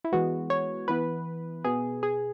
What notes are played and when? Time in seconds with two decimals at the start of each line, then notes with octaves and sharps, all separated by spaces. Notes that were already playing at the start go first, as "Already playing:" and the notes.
0.05 E4
0.13 E3 G#3 B3 F#4
0.50 C#5
0.88 E3 B3 B4
1.65 B2 B3 G#4
2.03 G#4